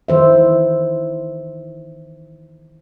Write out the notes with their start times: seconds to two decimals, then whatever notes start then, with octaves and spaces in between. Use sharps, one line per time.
0.08 D#3 E3 C5 E5